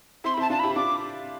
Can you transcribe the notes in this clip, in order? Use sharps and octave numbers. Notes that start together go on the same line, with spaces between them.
C4 E4 C6
B5
C4 E4 A5
D4 F4 A5
E4 G4 B5
G4
D4 F4 D6